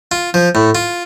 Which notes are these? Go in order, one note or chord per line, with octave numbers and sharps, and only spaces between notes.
F4
F3
A2
F4